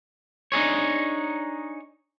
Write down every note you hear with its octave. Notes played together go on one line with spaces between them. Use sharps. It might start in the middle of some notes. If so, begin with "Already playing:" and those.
D4 D#4 G#4 C#5